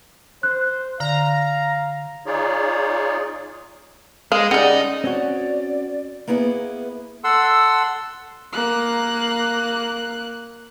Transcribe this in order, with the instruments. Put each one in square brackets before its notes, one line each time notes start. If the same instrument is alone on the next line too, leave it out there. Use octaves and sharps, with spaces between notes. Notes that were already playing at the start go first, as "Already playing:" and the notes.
[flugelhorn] C5 [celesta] F#6
[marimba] D3 [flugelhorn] F5 [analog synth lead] A#5
[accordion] D#4 F4 G#4 C#5 D5
[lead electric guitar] G#3 [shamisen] F5
[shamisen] C#3 G3 [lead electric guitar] D#4 [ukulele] D5 F#5
[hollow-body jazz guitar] C4 C#4 F#4 [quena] D5
[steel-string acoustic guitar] A#3 B3 E4 G#4 B4
[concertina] A4 F#5 C6 E6
[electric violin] A#3 F#6